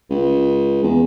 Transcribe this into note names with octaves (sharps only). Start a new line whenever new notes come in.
C#2
E2